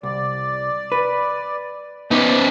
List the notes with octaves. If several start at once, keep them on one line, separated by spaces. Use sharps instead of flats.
C2 D5
B4
B3 C#4 D#4 C5 D5